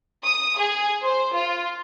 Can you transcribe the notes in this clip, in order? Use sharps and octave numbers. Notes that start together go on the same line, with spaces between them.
D#6
G#4
C5
F4